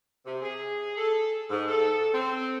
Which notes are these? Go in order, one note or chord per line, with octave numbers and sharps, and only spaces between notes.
C3
G#4
A4
G#2
A4
C4